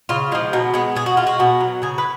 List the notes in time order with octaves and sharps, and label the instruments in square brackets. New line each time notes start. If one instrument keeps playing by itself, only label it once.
[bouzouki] C#3 F4
G#3 F4
F3
B2 D#4
G#3 B3
B2 G#4
F#4
G#3 F4
F#4
B2
F#3
C#3 G#4
B4